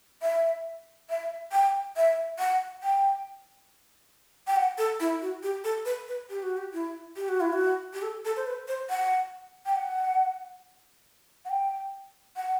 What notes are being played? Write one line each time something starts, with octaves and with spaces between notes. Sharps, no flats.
E5
E5
G5
E5
F#5
G5
G5
F#5
A4
E4
F#4
G4
A4
B4
B4
G4
F#4
G4
E4
G4
F#4
E4
F#4
G4
A4
A4
C5
B4
C5
F#5
G5
F#5
F#5
G5
F#5